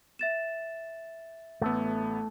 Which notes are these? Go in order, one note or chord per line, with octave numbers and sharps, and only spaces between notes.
E5 A6 E7
A1 A3 B3 A4